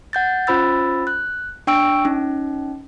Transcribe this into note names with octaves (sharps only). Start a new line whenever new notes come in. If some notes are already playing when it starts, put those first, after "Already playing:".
F#5 G6 A6
C#4 F4 C5 B5 E6 A6
F#6
D4 G5 C#6 E6 D7
C#4 D#4